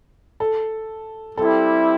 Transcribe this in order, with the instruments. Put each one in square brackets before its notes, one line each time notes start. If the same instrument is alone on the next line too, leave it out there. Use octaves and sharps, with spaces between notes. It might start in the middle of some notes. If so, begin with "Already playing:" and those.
[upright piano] A4
[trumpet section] G3 C4 E4 G4 [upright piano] A4